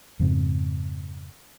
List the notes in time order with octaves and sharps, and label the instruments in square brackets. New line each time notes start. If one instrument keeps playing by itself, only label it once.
[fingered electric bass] F2 G#2 C#3 C4